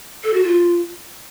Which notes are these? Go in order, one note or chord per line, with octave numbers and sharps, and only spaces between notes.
A4
F#4
F4